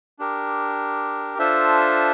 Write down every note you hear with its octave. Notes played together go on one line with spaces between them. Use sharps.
D4 G4 A#4
D4 F4 A4 C5 E5